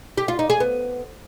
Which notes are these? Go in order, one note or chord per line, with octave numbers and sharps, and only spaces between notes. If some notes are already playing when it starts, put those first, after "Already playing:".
G4
F4
D#4
G#4
B3